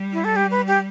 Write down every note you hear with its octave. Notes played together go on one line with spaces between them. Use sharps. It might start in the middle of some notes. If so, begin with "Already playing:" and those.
Already playing: G3
E4
A4
G4
B4
G4